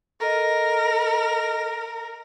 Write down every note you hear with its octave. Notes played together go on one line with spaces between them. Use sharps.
A4 A#4 D#5